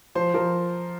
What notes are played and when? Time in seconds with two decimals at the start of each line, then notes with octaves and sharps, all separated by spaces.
0.15 F3 C5
0.34 F3 A#4